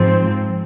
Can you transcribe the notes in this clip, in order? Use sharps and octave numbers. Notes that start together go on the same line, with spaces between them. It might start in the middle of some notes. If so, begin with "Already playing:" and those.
Already playing: G#2 F3 C4